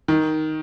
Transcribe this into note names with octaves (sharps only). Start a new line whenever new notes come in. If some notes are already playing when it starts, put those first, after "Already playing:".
D#3